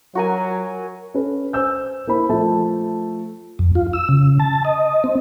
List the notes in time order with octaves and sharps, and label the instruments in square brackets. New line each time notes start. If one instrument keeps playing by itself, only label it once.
[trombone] F#3 [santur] F#4 A#4 G#5
[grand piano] C#4 A4 B4
C5 G#5 E6 G6
A#3 E4 C5 B5
F3 A3 E5 A5
[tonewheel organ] F2
F4
E6
C#3
A5
D#5
C4